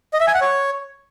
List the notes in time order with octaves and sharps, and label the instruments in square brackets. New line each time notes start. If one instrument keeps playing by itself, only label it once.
[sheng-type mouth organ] D#5
E5
G#5
F#5
C#5